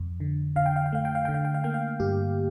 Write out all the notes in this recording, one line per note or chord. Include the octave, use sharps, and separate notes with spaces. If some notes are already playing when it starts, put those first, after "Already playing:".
Already playing: F2
D3
D3 F5
G5
F5
G5
A3 F5
G5
F5
D3 G5
F5
G5
F5
A#3 G5
F5
G2 G4